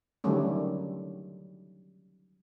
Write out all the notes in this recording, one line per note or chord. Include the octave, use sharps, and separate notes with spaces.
D3 D#3 F#3 G3 A3 C#4